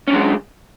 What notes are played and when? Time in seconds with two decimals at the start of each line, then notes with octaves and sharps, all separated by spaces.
0.08 C#4
0.10 D4
0.13 F#3
0.15 G#3